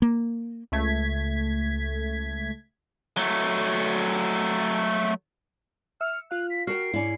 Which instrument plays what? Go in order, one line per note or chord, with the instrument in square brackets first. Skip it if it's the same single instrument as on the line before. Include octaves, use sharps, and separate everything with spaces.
[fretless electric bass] A#3
[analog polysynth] C#2 A3 G#6 B6
[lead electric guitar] F#3 A3
[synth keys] E5 E6 C#7 [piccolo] F6
[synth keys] F4 F5 [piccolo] F#6
[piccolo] B6
[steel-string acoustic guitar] F#4 A#4 G5 [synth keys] F6 [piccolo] C7
[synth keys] G#2 D5 C#7 [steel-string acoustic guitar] C#4 E4